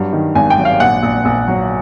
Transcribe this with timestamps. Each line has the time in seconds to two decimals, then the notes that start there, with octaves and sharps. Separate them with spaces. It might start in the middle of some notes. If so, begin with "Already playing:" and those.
Already playing: G2 F#3
0.13 D#3
0.35 G#1 G#5
0.50 G5
0.58 F#3
0.65 F5
0.80 A#1 F#5
1.03 A#1
1.25 A#1
1.48 F#3